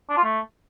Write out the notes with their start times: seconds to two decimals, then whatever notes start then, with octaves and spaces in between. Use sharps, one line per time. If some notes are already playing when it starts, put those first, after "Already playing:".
0.10 D4
0.17 F4
0.25 A3